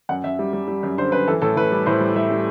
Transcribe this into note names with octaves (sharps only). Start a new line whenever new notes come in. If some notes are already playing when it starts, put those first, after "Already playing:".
F#2 F#5
F#2 E5
G3
G3
G3
F#2
D3 C5
F#2 B4
E3 A4
A2 A4
A2 B4
G3
A2 C5
G3
G3 E5
G3